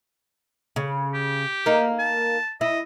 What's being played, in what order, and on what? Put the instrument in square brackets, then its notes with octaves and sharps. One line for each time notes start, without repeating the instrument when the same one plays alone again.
[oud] C#3
[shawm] G4
[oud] A#3 D#4
[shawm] A5
[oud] E4 [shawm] D#5